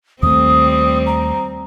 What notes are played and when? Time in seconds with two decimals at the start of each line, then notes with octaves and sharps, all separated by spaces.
0.23 D#2 G3 A3 C4 D#6
1.06 A#5